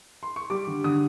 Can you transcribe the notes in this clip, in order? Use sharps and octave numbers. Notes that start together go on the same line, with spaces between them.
C6
C#6
G3 D6
D3
D3 D#6